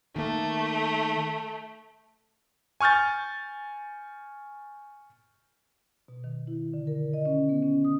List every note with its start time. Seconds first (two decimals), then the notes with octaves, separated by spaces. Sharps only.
0.16 D#3 A3 A#3
2.80 G#5 C#6 F6 G6 A6
6.08 B2
6.24 D#3
6.47 E4
6.74 D3
6.87 A#4
7.13 D#5
7.26 C#4
7.49 B3
7.63 C#4
7.85 D#6